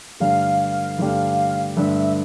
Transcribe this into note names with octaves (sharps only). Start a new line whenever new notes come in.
G2 D3 A3 D4 G4 F5
G2 D3 A3 D4 G4
G2 D3 A3 D4 G4 E5